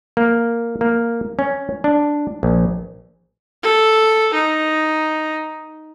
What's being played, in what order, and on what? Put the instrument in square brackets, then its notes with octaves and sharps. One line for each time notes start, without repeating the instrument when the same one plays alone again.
[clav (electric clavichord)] A#3
A#3
C#4
D4
A#1
[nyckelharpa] A4
D#4